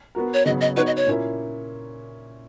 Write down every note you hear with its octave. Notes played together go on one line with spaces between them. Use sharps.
B3 F#4 A#4
C#5
C#3 F#3 B3 D#5
D#5
B3 D#4 F#4 B4 C#5
D#5
C#5
A#2 A#3 C#4 E4